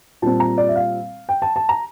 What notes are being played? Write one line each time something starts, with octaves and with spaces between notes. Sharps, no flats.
A#2 G3 C4 A5
A#5
D5
E5
F5
G5
A5
A5
A#5